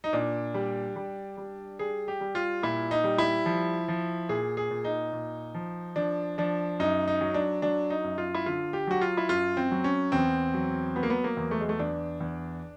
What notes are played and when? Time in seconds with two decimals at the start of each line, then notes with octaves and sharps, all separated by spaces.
0.04 D#4
0.13 A#2 D4
0.54 G3
0.96 G3
1.38 G3
1.79 G3 G#4
2.08 G4
2.21 G3
2.35 F4
2.63 A#2 E4
2.91 D#4
3.04 G3
3.18 E4
3.46 F3
3.88 F3
4.29 A#2 G#4
4.57 G#4
4.71 A#2
4.85 D#4
5.12 A#2
5.55 F3
5.96 F3 D4
6.38 F3 D4
6.79 F#2 D#4
7.08 D#4
7.21 F#3
7.34 D4
7.62 F#3 D4
7.90 D#4
8.04 F#2
8.18 F4
8.34 E4
8.46 D3 F4
8.73 G4
8.87 F#3 F#4
9.01 F4
9.17 E4
9.29 F#2 F4
9.57 C4
9.71 F#3
9.84 C#4
10.12 E2 C4
10.54 F#3
10.96 F#3 B3
11.03 A#3
11.10 B3
11.24 A#3
11.37 E2
11.51 A3
11.60 G#3
11.69 A3
11.79 E2 D4
12.20 E2